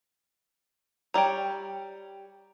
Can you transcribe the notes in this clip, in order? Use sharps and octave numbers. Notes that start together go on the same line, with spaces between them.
G3 C#5 G5 A#5